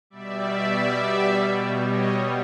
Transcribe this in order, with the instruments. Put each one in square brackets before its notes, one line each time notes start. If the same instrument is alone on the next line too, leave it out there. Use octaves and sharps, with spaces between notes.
[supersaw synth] B2 G3 D5 E5
C#5 D#5